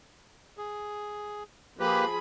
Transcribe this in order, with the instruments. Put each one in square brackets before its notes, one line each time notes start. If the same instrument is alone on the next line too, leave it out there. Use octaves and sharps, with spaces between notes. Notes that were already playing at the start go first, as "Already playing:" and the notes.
[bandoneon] G#4
[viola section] F3 G#4 B5 [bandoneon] A#3 G4 B4